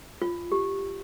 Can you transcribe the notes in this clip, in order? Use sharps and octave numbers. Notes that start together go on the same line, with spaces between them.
F4
G4